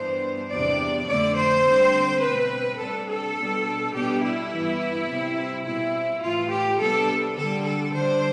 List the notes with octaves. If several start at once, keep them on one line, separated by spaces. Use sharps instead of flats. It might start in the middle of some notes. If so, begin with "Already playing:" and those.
Already playing: G2 E3 B3 D4 C5
E2 C3 G3 B3 D4 D5
F2 D3 A3 D5
C5
D3 G3 C4
B2 A3 C4 B4
C3 G3 D4 A4
A4
B2 G3 D4
B2 G3 B3 D4 G4
E4
G2 E3 B3
C3 G3 C4
B2 G3 C4 E4
A2 E3 A3 F4
G4
C3 G3 B3 D4 A4
D3 G3 D4 A4
A4
D3 G3 D4 C5